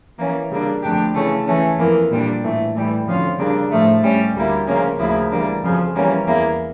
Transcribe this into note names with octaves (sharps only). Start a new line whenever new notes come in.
E3 A#3 C#4
C#3 G3 A#3 D4
F2 D3 A3 D4 G4
C#3 E3 A3 C#4
E3 A3 C#4
F2 E3 A#3
A#2 G3 D4
A2 E3 A3
A2 E3 G3
F2 D3 F3 C#4 F4
C#3 G3 A#3 D4
A2 F3 A3
A2 G3 C#4
D2 D3 G3 A#3 E4
C#3 F3 A#3 C#4
D2 C#3 F3 A#3 E4
E3 G3 A#3 D4
F2 C#3 F3
E3 G3 A#3 C#4
E2 E3 A#3 E4